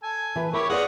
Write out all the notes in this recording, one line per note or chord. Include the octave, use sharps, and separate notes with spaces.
A4 G#5
E3 B4
E4 G4 A#4 C#5
F4 G#4 B4 D5 D#5 F#5